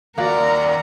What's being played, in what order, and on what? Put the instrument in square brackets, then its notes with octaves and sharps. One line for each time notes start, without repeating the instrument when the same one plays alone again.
[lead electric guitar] D#2 D5 [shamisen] A#3 F4 F#4 [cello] A#4 [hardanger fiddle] F#5 A#5